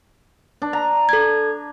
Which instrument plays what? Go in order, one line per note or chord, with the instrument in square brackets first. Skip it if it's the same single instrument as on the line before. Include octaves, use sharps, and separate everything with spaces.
[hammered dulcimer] D4
A#5
[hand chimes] A4 G#6